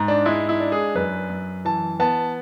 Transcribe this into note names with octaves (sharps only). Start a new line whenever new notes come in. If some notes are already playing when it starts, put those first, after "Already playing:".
Already playing: G#2
D4
G#3 E4
E4
D4
G#4
F#2 B4
F#2
E3 A5
B3 A5